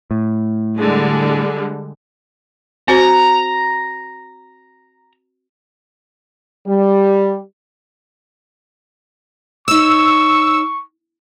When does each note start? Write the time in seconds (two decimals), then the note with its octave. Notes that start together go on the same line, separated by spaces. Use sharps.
0.11 A2
0.78 D3 G3 G#3
2.88 C4 F#4 C5 A#5
6.67 G3
9.68 D#4 C#5 C#6 E6